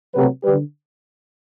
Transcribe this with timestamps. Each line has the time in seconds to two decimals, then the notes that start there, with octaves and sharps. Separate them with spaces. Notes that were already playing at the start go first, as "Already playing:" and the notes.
0.15 C3 F#3 A3 G4 B4
0.43 D3 G3 G4 B4